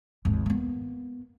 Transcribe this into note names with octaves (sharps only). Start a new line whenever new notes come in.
G#1 D#2
A#3 B3